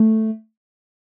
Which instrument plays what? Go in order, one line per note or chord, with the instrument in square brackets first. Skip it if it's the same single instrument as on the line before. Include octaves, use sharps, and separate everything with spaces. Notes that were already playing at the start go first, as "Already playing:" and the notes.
Already playing: [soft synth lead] A3